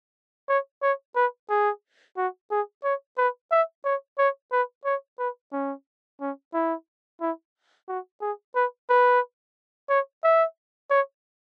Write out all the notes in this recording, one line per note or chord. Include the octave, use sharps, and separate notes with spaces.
C#5
C#5
B4
G#4
F#4
G#4
C#5
B4
E5
C#5
C#5
B4
C#5
B4
C#4
C#4
E4
E4
F#4
G#4
B4
B4
C#5
E5
C#5